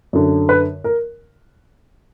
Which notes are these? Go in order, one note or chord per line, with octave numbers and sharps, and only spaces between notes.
F#2 D3
B4
A#4